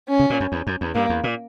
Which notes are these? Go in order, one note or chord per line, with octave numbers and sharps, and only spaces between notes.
C#4
C#3
A#2
F#2
E2
F#2
E2
G2 A#3
E2
A#2